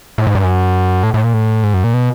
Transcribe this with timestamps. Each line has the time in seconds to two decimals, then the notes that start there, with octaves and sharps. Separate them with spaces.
0.18 A2
0.27 G#2
0.35 G2
0.44 F#2
1.03 A2
1.14 A2
1.24 A#2
1.34 A2
1.64 G#2
1.74 F#2
1.84 A#2
1.94 B2